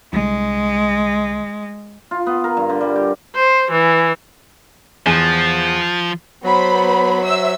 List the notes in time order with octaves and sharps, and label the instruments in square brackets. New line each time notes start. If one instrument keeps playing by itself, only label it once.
[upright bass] C2 D3 [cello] G#3
[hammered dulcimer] F4
B3
A#4
G2
D3
G3
G4
[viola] C5
E3
[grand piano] E2 [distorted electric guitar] F3
[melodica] F#3 [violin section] B3 C5 B5
[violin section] C5 E5 E6